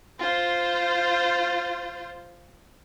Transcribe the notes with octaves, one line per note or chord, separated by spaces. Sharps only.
F4 C5